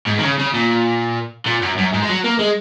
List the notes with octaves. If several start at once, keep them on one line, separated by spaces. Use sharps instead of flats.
G#2
D#3
C#3
C#3
A#2
A#2
F#2
F#2
G#2
G#3
F#3
A#3
G#3